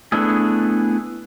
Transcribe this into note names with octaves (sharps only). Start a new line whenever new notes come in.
A3 B3 D4 E4 G#4